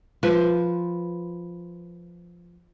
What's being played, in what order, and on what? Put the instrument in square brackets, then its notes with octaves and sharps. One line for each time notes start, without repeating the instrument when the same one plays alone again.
[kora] F3 B4 C5